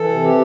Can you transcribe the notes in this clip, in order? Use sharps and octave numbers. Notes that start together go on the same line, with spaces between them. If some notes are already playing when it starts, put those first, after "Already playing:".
Already playing: E3 A4
C3
G4